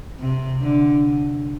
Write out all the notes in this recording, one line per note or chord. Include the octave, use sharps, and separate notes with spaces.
C3
D3